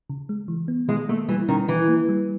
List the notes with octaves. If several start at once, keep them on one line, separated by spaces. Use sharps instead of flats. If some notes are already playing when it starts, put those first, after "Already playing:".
C#3
G#3
E3
B3
D#3 G#3
A3 A#3
E3 G3
D#3 C#4
D#3 E3
A#3
G3